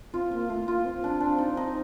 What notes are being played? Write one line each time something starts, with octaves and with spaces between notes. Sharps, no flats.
C4 F4
A#3 F4
A3 F4
A#3 F4
C4
D4
D4
D#4
D#4